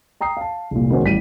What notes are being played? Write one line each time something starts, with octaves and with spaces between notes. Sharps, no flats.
G5 A#5 D#6 C7
F5 A5
F1 C2 A#2
D#3 G#3 B3 C#4 F#4 C5
A1 G3 B6 D#7